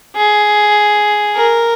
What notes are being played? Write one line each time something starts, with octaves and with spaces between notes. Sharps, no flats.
G#4
A#4